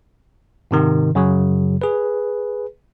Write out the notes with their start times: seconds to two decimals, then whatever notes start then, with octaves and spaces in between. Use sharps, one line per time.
0.71 G#2 C3 D#3
1.15 F#2 C#3 F#3
1.82 G#4 B4